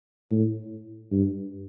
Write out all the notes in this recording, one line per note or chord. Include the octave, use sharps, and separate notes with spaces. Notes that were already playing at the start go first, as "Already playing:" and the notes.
A2
G2